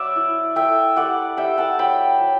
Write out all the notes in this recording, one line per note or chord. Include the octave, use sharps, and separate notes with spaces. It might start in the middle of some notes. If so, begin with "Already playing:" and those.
Already playing: F#3 B4 D5 E5
E4
A3 E5 G5
G3 D5 F#5
G3 E5 G5
F#5 A5
F#3 G5 B5
F#3